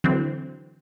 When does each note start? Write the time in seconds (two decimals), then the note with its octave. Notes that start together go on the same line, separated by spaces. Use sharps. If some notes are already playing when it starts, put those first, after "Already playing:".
0.04 D3 E3 F#3 C4